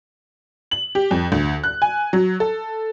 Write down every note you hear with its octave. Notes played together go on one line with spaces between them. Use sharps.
F#7
G4
F2
D2
F#6
G#5
F#3
A4